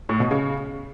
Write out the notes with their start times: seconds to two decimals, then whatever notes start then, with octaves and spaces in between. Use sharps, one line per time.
0.09 A2
0.20 B2
0.31 C#3